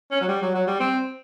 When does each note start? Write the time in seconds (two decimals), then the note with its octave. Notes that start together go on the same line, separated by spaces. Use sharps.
0.11 C#4
0.21 F#3
0.28 G3
0.42 F#3
0.54 F#3
0.67 G3
0.80 C4